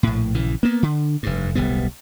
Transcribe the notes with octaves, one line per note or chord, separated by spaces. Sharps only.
A#1 A2
A#1 C#3 E3
A#3 B3
D3
F1 G2
D1 B1 G3 B3